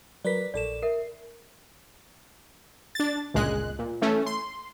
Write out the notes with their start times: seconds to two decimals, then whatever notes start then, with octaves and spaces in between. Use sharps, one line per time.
0.25 F#3 A#4 B4 D5 B6
0.54 A#1 A4 D5 E7
0.82 A#4 E5 C7
2.95 D4 A6
3.34 G1 C#2 A#2 G#3 F#6
3.79 A#2
4.01 E3 A3 C#4
4.26 C6